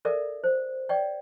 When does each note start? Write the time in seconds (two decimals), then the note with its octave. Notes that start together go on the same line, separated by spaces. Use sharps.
0.05 A4 A#4 D5 E5
0.44 C5
0.89 C#5 D5 G5